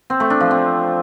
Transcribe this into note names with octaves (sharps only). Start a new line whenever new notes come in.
C4
A3
D4
F3
C4